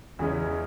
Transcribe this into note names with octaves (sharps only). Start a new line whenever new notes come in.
E2 C#3 E3 G#3 C#4